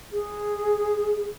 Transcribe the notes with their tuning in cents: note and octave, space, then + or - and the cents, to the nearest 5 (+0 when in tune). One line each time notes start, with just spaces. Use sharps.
G#4 -5